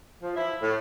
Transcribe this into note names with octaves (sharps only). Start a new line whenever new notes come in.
F3
E4
A2